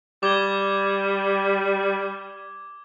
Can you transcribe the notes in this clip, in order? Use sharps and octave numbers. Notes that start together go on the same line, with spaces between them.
G3 D6 G#6 G7